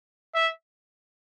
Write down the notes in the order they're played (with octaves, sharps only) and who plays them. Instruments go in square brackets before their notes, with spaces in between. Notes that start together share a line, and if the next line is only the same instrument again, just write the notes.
[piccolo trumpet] E5